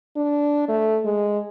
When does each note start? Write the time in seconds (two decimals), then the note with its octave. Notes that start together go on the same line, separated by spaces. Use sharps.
0.17 D4
0.69 A3
1.05 G#3